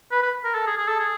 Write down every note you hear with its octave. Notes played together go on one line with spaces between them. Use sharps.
B4
B4
A#4
A4
G#4
G#4
A4
G#4